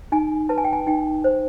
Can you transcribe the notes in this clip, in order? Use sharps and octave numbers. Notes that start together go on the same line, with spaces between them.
D#4 G#5
B4 A5
G#5
G5
G#5
D#4 G5
C5